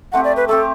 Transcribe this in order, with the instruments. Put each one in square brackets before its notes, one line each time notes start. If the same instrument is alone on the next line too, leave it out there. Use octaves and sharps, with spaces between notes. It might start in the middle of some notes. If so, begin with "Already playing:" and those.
[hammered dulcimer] A3 C4 G4 [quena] F#5
[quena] D5
B4
[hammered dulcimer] A3 C4 G4 [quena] A4